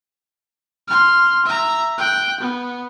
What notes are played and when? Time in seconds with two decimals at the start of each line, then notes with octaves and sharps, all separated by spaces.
0.88 C6 F6
1.46 E5 A#5
1.98 G5 F#6
2.40 B3